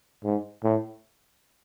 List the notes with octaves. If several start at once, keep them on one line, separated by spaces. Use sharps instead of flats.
G#2
A2